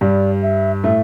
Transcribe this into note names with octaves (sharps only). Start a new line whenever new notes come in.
G2 G3 D5
E5
A2 A3 E5